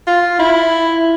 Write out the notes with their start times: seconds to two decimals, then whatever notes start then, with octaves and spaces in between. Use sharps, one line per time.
0.07 F4
0.39 E4